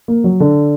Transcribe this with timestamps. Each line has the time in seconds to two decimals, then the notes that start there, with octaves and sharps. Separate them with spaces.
0.08 A#3
0.24 F#3
0.40 D3